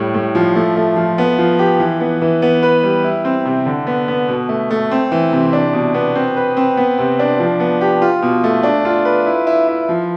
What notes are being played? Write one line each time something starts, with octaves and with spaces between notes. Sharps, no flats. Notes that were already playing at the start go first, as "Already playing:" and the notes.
Already playing: A2 G3
A2
F3
A3
A3
F3
B3
F3
G4
E3
B3
E3
B3
B4
G3
E4
C4
C3
D3
B3
B3
B2
A3
A3
C4
E3
C3
D4
B2
B3
C4
B4
C4
B3
C3
D4
F3
B3
G4
F4
B2
A3
D4
F4
B4
E4
E4
E4
F3